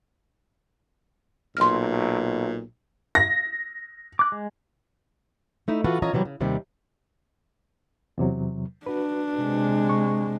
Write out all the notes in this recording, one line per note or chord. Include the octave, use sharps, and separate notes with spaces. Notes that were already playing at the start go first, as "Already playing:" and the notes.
B1 A#2 C6 F6
A#6
D6 F#6
G#3
A3 D#4 E4
E3 F4 F#4 A4 B4
E3 C#4 F4 C#5 D#5 A#5
C3 E3 F#3 G3
C#3
D#2 C3 D#3 G3
E2 C3 F#3
D4 F#4 B4
C3 G#3
C#6